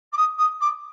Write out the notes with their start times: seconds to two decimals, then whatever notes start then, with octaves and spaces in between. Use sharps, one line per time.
0.12 D6
0.17 D#6
0.38 D#6
0.60 D6